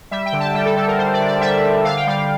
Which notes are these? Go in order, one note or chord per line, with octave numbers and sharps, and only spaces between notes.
G3 E5
G5
D3
A5
G3 G5
A4
D3 A4
A#4
G3 C5
D5
D3
D5
G3 E5
G3
D3 F5
G5
G3 F5